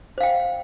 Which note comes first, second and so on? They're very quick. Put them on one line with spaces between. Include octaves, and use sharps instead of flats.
C5 F5 G5